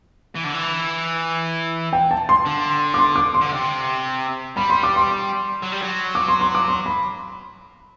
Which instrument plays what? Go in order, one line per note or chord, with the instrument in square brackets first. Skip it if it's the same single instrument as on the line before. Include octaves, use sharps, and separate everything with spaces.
[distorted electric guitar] E3
D3
E3
[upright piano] G5
A5
C6
[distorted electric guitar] D3
[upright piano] D6
C6
D6
C6
[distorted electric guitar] D3
C3
[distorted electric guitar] G3 [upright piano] B5
[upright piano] C6
D6
C6
[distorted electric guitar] F#3
G3
F#3
[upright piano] D6
C6
C6
D6
C6
B5